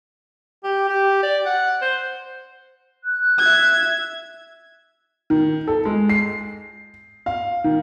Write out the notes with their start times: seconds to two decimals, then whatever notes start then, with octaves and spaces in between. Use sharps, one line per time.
0.64 G4
0.89 G4
1.23 D5
1.46 F#5
1.82 C5
3.04 F#6
3.39 E5 G#6
5.30 D#3
5.67 A4
5.85 G#3
6.10 C7
7.26 F5
7.64 D#3